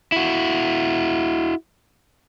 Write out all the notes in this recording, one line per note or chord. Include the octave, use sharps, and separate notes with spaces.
E4 F#4